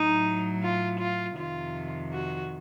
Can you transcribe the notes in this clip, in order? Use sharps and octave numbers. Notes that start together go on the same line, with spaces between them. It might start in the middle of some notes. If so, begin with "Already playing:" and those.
Already playing: A2 F#3 D#4
F4
F4
F2 C3 D#3 F4
F#4